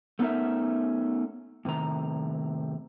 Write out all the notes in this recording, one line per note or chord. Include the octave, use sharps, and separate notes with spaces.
A3 B3 C#4 D#4 A#4 E5
A2 C3 D#3 A#5